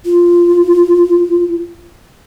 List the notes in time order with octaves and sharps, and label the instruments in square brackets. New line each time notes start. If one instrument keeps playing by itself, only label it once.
[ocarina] F4